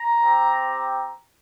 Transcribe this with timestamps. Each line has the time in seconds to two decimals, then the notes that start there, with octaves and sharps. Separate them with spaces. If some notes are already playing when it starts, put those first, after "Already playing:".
Already playing: A#5
0.23 C4 G4